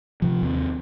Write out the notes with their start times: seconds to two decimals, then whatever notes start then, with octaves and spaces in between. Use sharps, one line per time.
0.22 C3 F3
0.42 D#2 C4